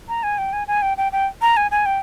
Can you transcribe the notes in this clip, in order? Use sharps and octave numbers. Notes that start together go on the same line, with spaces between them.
A#5
G#5
G5
G#5
G#5
G5
G5
G5
A#5
G#5
G#5
G5